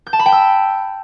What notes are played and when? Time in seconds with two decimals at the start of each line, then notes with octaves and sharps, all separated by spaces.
0.07 G6
0.13 A5
0.19 B5
0.26 G5
0.32 E6